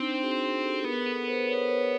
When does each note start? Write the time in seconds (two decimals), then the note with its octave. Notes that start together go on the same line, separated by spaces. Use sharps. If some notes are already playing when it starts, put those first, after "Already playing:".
Already playing: C4 D4 D#4
0.22 F#4 G#4
0.43 F#4 G#4
0.64 G4 A4
0.85 B3 G#4 A#4
1.06 A4 B4
1.19 B4
1.27 A#4 C5
1.48 B4 C#5
1.69 B4 C#5